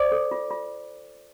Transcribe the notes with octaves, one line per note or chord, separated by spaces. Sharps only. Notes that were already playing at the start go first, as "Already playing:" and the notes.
Already playing: C5 D5 D6
A4
F4
F4